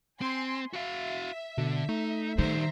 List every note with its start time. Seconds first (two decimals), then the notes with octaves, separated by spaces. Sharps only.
0.21 C4 G#5 C6
0.73 F#4 E5 F5
1.58 B2 D3
1.89 A3 D#4
2.38 D#3 G3 D#4 C5 E5 A#5